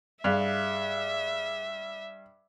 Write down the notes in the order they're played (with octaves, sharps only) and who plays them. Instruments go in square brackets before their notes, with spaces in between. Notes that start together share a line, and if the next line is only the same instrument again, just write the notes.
[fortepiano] G2 [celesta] G#4 F5 F7 [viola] E5